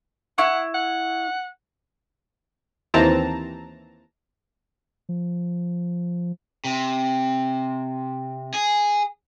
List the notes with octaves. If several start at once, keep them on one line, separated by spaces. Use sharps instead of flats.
E4 F#5 C#6
F#5
D#2 E3 C4 A5 A#5
F3
C3
G#4